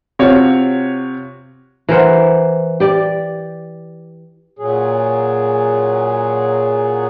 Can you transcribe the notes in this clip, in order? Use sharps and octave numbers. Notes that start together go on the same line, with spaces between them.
C3 F4 F#4 C#5
E3 A#4 C5 F#5
G4 D5
A#2 F#3 G#4